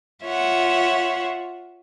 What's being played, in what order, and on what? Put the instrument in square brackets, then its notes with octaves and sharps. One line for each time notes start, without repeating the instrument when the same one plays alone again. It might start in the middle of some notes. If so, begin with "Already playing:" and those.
[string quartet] F4 C#5 E5 F#5